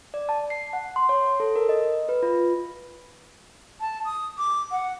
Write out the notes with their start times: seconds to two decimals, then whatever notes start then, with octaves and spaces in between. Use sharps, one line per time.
0.14 D5
0.29 A5
0.50 C7
0.73 F#5
0.96 C6
1.09 C#5
1.40 A4
1.56 A#4
1.69 D#5
2.09 B4
2.23 F4
3.81 A5
4.05 D#6
4.38 D6
4.71 F#5